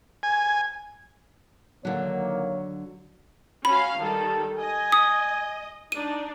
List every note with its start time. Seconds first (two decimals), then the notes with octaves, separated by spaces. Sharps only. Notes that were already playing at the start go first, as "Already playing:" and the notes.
0.23 G#5
1.85 D3 D#3 F#3 A#3 C#5
3.65 C#4 F#4 F5 B5
3.99 D#3 G3 A4 A5
4.58 D#5 G#5
4.92 D#6
5.92 D4 D#4 D#7